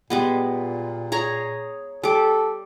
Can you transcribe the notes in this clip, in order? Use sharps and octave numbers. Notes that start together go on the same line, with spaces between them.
A#2 G3 G#3 B3
G#4 C#5 A#5
G3 A4 D6